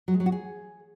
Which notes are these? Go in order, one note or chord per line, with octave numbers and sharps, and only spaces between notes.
F#3
G#3
F#3
F#4
G#4